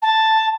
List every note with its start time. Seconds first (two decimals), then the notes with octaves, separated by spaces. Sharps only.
0.02 A5